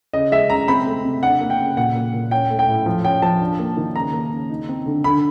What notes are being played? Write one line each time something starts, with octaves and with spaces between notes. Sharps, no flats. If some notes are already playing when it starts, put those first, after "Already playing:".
C#3 D#5
G#3 E5
C#3 A#5
C4 B5
A3
C3
D4 F#5
A#3
G5
C#3
A#2 F#5
A#3
A#2
C#4 G5
A3
G5
A2
F3
C#4 G5
F3 A5
D4
A#3
D#3
C#3 A#5
A#3
C#3
D#4
C4
D3
D3 B5